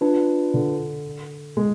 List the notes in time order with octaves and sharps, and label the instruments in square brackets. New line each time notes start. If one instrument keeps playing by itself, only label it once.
[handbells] D4 F4 B4
[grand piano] D3
G#3